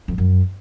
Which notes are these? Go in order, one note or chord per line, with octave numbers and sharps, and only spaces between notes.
F2
F#2